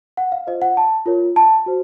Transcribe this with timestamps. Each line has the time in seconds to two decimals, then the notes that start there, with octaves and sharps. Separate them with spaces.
0.17 F#5
0.32 F5
0.47 F4 C5 D#5
0.62 F#5
0.77 A5
1.06 F4 A#4 C#5
1.36 A5
1.66 F#4 C5